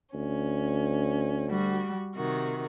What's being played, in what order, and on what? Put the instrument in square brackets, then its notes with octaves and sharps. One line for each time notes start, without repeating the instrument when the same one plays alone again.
[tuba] D2 [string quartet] C#4
[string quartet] G3 F#4
C3 D#3 F#4